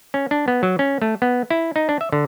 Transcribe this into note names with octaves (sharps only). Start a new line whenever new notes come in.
C#4
D4
B3
F#3
C#4
A3
B3
E4
D#4
D4
E5
D3